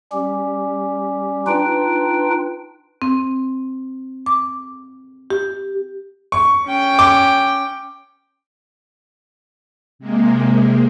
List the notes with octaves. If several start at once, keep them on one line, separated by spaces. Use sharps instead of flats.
G3 C#4 G4
D4 D#4 F4 B4 G5
C4
D6
G4
C#6
C#4 G5
D6
C3 G#3 A#3